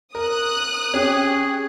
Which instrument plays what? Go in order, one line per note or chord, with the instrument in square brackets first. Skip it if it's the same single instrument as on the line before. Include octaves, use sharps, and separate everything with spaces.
[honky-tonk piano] A#4 [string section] D#6 F#6
[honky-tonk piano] C#4 G4 [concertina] G#4